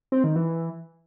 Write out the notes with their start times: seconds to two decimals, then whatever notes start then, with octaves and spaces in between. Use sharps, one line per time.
0.12 C4
0.24 D#3
0.36 E3